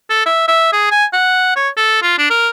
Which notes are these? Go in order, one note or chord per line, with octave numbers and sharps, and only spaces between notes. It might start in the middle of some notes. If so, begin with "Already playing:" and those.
A4
E5
E5
G#4
G#5
F#5
C#5
A4
F4
D4
A#4